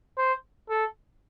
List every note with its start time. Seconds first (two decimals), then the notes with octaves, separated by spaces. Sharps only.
0.18 C5
0.70 A4